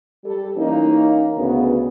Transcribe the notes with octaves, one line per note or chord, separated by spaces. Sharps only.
G3 A4
E3 A#3 C#4 D#4
D2 C#3 B3